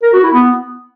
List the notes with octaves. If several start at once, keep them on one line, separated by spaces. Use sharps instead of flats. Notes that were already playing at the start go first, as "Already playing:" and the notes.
A#4
F#4
E4
B3